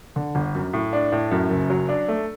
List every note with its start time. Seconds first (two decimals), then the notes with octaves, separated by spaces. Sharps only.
0.16 D3
0.35 G1
0.55 F#2
0.73 A2
0.93 D4
1.12 A2
1.31 F#2
1.50 F#1
1.70 F#3
1.89 D4
2.08 A3